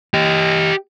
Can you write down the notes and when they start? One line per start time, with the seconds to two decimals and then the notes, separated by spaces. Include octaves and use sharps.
0.14 G4 D#5